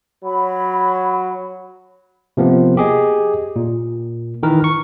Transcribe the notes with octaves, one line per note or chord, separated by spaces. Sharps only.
F#3 B5
C3 F3 A#3 B3
G4 G#4 D#5
A#2
D#3 E3 A#4 B4
C#6